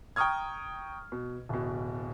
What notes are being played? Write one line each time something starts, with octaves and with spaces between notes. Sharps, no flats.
G5 A#5 C#6 D#6 F6 G#6
B2
D1 B2